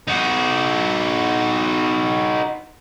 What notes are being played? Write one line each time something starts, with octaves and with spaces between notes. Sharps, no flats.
D#4 F#4